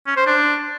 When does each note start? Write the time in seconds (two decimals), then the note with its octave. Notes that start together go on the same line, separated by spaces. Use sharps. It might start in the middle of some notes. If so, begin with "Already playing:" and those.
0.07 C#4
0.17 C5
0.27 D4